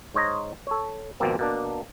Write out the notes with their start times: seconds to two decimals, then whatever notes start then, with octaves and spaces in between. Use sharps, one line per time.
0.14 G#2 C5 C#5 D#5 A#5
0.67 A4 C#5
1.20 G#1 B2 F3 A#3 C4
1.39 B2 A#3 D4